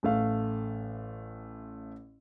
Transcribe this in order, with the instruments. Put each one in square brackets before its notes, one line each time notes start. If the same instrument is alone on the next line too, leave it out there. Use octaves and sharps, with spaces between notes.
[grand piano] A1 A3 F5